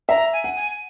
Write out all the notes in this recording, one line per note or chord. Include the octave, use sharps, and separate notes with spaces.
E5 A#5
G#5
F#5
G#5